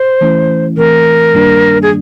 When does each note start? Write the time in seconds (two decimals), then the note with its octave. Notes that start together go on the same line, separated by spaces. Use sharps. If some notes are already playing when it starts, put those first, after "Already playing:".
Already playing: C5
0.21 E3 A3 C#4 E4
0.77 E3 A3 C4 A#4
1.33 G2 D#3 G3 A#3 D4
1.82 G#4